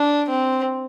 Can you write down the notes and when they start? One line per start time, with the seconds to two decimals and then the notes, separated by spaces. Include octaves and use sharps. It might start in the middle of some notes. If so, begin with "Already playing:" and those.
Already playing: D4
0.29 C4